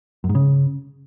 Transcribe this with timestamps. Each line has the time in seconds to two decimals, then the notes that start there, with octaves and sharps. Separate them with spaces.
0.24 F#2
0.29 G#2
0.35 C#3